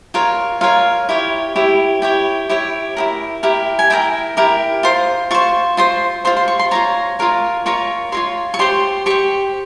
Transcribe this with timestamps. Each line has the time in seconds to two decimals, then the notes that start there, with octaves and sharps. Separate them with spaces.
0.14 F4 A#4 C#5
0.61 F4 A#4 C#5 F5
1.09 E4 G4 C#5
1.56 E4 G4 C#5
2.02 E4 G4 C#5 G5
2.49 E4 G4 C#5
2.97 E4 G4 A#4
3.43 E4 G4 A#4
3.79 G#5
3.90 E4 G4 A#4 G5
4.37 E4 G4 A#4
4.83 F4 C5 C6
5.31 F4 C5 C#6
5.77 F4 C5 C6
6.25 F4 C5 C6
6.37 C6
6.48 C#6
6.59 C6
6.71 F4 A#4 C#5 A#5
7.19 F4 A#4 C#5
7.66 F4 A#4 C#5 C#6
8.12 F4 A#4 C#5 C6
8.54 C#6
8.59 G4 C5 C6
9.06 G4 C5 C#6